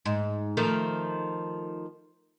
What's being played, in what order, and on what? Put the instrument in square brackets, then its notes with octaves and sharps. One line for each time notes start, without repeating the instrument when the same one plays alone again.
[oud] G#2
D#3 F3 A3